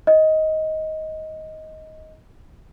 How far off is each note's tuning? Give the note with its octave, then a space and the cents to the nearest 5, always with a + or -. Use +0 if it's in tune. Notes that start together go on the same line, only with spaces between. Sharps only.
D#5 +15